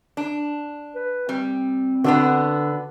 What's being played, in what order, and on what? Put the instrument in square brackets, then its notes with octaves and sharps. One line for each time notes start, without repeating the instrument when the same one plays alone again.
[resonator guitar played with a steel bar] D4
[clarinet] B4
[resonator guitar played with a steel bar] G3 [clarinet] C4
[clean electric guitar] D3 [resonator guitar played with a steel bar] B3 D4 F#4